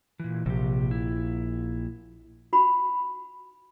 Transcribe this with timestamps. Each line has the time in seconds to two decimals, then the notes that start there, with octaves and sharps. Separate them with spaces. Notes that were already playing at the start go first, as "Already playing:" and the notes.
0.20 A#2 E3
0.46 A#1 C3 G4
0.91 E4
2.53 F#4 B5